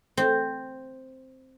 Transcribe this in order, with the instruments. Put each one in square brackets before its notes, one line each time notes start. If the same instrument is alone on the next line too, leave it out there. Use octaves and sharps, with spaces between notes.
[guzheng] C4